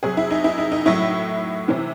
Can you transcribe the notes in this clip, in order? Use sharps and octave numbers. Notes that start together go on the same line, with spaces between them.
C3 F#3 G#4
E4
D#4
E4
D#4
D#4
A2 F#3 E4
C3 E3